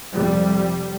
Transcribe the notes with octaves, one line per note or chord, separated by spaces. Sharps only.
F2 C3 G3